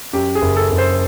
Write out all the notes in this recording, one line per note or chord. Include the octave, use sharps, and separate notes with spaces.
F#2 G4
G#4
F#1
A4
F#1
C5